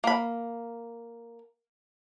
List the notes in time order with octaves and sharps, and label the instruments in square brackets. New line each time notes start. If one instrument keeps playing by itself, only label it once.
[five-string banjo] A#3 B5